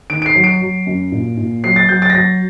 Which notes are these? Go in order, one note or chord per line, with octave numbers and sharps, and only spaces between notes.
D#3 D7
D7
C7
F#3
D7
F#3
F#2
A#2
A#2
F#3 C7
A6
F#3 G6
A6
A#6
F#3 A6